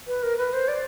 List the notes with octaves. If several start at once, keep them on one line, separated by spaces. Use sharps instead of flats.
B4
A#4
B4
C5
D5